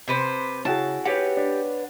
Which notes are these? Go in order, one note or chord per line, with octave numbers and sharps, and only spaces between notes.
C3 B4 C5
C#3 E4 F#4 G#4 A5
G4 B4 C#5 F#5
D4